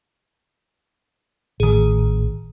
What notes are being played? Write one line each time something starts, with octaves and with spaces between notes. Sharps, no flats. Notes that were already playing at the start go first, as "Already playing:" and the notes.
A1 D#3 G#4